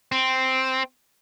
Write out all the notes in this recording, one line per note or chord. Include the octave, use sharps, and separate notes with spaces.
C4